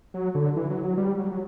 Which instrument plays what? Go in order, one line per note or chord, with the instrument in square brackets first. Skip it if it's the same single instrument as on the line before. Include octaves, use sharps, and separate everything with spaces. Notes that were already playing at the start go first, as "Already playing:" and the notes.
[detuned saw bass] F#3
D3
E3
F#3
F#3
G3
F#3
F#3